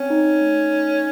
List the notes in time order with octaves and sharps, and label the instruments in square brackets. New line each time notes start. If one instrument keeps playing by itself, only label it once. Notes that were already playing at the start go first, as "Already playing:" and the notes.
Already playing: [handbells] C4 [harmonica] C#4
[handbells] D#4
A3
D#4